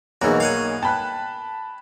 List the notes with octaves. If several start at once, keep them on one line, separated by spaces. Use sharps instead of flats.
B1 E2 A#3 D#4 F#4 A#4 C#5
F5 F#5 G#5
G5 A5 B5 F#6